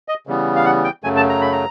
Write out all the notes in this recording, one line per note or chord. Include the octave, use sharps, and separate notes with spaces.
D#5
C#3 E3 G3 B3
F5
F#5
G5
F#2 C#3 F#3 A3 G#5
A5
A#5
B5
A#5